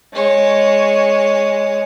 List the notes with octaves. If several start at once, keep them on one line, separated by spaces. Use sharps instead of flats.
G#3 C#5